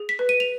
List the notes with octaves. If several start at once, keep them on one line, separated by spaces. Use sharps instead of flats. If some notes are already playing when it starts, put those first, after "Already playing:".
Already playing: G#4
B6
B4
D#7
F7